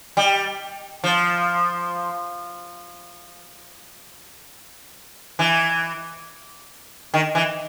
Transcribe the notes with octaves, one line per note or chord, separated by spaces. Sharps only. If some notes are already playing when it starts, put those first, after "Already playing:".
G3
F3
E3
D#3
E3